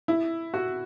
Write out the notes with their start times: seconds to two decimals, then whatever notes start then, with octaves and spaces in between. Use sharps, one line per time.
0.08 E4
0.54 F#4